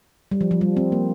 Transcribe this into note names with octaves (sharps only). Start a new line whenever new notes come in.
G3
F3
F3
G3
C4
A#3